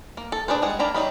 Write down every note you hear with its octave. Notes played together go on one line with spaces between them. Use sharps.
A#3
A4
D4 G#4 B4 C5
G3 G#3 G#4 F#5
D#3 A#3 D4 A#5 B5
F#3 G3 D#4 B5